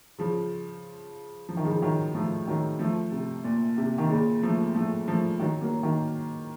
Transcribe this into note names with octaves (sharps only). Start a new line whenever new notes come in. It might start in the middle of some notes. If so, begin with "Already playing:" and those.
C#3 F3
F3
D#3
C#3 F3
D#3 F#3
F3 A3
D#3 F#3
F3 A3
C3
A#2
C3
D#3
A#2 C#3
F3 A3
F3 A3
F3 A3
D#3 F#3
F#3 A#3
D#3 F#3